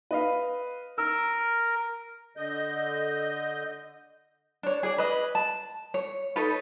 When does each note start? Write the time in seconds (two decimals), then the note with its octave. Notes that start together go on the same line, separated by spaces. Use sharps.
0.11 B4 D#5 F5
0.98 A#4 E6
2.37 D3 D#5 G6
4.63 D4 C#5
4.83 G#4 D5
4.98 B4 D#5
5.35 A5
5.94 C#5
6.36 D#4 A4 B4 C#5